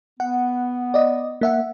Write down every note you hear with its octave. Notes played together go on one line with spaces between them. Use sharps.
B3 F#5
D5 D#5
A#3 E5 F#5